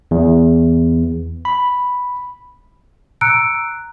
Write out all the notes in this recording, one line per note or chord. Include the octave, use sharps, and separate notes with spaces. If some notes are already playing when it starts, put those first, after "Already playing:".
E2
B5
A#5 E6 F#6 C#7 D7